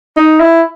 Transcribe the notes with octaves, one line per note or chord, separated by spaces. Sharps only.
D#4
E4